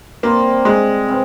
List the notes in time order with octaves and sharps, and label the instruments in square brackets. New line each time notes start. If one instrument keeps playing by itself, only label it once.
[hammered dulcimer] C3 G3 C4 F4 [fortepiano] A#3
[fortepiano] G#3
[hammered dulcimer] C3 G3 C4 F4